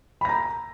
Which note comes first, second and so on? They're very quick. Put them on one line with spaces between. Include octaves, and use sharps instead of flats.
B5 A#6 A#5